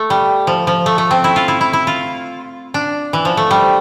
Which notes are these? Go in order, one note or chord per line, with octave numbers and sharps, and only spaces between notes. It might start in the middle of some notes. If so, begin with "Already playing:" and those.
Already playing: A3
G3
F3
F3
A3
A3
C4
E4
F4
E4
E4
E4
F4
D4
E3
F3
A3
G3